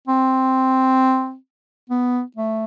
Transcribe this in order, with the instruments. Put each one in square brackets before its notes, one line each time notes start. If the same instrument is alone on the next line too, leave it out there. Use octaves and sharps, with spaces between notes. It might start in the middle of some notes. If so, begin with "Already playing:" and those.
[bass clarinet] C4
B3
A3